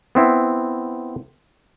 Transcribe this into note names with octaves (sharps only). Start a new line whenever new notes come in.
B3 C4 E4